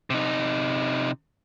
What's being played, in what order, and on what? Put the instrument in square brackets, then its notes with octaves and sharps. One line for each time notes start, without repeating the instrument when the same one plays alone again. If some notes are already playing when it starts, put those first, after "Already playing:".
[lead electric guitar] C3 D#4